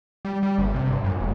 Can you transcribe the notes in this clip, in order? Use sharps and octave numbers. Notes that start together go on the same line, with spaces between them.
G3
G3
G1
C3
G2
F#2
E1